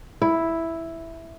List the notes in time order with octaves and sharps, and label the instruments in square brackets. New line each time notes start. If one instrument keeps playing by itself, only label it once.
[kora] E4